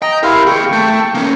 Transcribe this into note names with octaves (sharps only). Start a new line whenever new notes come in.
D#5 G5 A#5
E4 G4 A#4 F5 C6
D#2 G#4 G5 C#6
A3
A#3 C#4 A#4